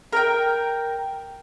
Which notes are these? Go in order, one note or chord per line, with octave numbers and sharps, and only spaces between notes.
A#4 G5